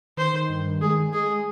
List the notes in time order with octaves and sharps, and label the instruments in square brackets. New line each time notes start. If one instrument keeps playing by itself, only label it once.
[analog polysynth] D#3 [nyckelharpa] C5
[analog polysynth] D#3
G2
D#3
[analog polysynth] G#3 [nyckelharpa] G#4
[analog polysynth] G#3
[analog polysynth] G#3 [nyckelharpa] G#4